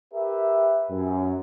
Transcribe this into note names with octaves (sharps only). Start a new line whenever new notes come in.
G4 A#4 B4 E5
F#2